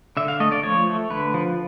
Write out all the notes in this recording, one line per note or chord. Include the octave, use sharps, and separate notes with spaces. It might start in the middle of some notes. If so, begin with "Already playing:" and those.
D3 E5
F5
A3 D#5
D5
F3 C#5
A3
D3 B4
F3